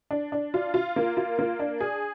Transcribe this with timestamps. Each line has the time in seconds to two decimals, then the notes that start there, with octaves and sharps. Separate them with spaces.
0.11 D4
0.32 D4
0.54 F4
0.74 F4
0.96 A#3
1.17 F4
1.39 A#3
1.59 D4
1.81 G#4